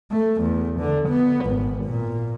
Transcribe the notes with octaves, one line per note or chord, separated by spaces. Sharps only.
A3
E2
D3
B3
G#1
A#2